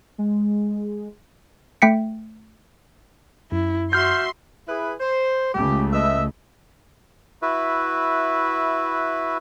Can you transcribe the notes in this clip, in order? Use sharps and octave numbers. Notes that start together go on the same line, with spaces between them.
G#3
A3 G5 B6 C#7
F#2 E4
F#4 E5 C6 F6 G6
E4 G#4 B4
C5
C#2 C#3 A3 G4
B4 D#5 E5
E4 F#4 B4 E5